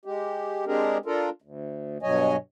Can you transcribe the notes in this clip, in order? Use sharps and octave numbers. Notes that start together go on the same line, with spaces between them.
G#3 G4
G#3 C4 D4 G4 G#4 A#4
D4 F4 A4 A#4
D2
G2 B2 F#3 C#5 D#5 G#5